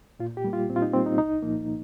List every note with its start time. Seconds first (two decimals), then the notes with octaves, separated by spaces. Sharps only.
0.19 A#2 F4
0.37 G4
0.44 G3 A#3
0.53 F4
0.69 A#2 C4
0.76 F4
0.82 D#4
0.93 G3 A#3 C4
1.06 D#4
1.18 C2 D#4
1.42 A#2 F3 A#3